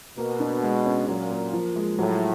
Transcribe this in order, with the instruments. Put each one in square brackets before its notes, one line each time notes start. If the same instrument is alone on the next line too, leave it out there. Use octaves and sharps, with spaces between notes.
[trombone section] B2 [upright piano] A#3
[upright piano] D4
G#3
C#4
[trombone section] A#2 [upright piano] F#3
[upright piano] A#3
F3
G#3
[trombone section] A2 [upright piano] F#3